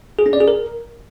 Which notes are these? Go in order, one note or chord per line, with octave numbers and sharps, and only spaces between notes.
G#4
C#4
D5
G#4
A#4